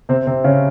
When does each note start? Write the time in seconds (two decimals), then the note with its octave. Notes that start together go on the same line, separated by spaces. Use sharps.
0.09 C3 C4
0.27 C3 C4
0.44 C#3 C#4